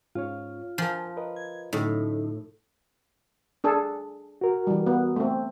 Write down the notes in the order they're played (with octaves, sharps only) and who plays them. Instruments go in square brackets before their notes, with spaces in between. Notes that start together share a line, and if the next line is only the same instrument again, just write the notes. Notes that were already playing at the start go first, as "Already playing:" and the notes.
[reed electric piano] G#2 C#4 C#5 [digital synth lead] F4
[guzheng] F3 [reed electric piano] A#4 G#5 A5
[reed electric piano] A#4 B4 D#5
[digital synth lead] G#6
[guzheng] A2 [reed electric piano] D3 F#3 C#4 [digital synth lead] D#4
[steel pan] D4 G#4 A4
[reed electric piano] F#4 A#4
[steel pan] E3 G3
B3
A3 C4